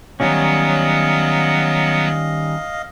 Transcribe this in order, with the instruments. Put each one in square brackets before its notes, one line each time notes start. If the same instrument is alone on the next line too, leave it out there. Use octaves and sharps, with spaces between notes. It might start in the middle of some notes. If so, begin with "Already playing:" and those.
[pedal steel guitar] D#3 G3 C#4 [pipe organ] F#3 B3 [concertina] D#5 F5